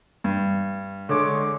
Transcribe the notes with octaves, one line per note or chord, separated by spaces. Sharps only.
G2
D3 G#3 C#5 D6